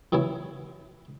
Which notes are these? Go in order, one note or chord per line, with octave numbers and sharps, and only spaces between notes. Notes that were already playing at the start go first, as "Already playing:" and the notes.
E3 F#3 B3 E4